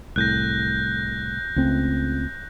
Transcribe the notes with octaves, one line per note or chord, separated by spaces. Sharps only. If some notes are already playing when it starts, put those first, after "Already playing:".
C2 A2 F#6 G6 A#6
C#2 A3 C4